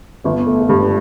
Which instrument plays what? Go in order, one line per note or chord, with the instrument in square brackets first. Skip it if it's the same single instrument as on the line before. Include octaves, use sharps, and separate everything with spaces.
[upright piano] G1 [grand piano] B3
[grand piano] A3
A3
[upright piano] G2 [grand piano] G3